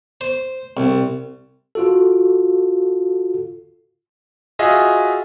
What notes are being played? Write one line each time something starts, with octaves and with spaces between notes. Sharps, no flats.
C5
C2
F4 F#4 A4
F4 F#4 G#4 D#5 E5